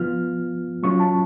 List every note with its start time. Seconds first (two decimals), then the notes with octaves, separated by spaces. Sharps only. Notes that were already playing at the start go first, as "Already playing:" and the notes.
Already playing: F3 B3 F4 F6
0.83 F#3 C#4 F4 C#6
1.00 A5